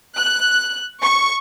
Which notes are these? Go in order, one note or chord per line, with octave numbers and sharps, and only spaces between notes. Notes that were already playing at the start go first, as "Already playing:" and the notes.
F#6
C#6